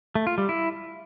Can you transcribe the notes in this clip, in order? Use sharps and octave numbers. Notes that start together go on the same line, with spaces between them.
A3
F4
G3
E4